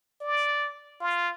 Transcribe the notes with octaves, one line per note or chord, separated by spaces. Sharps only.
D5
F4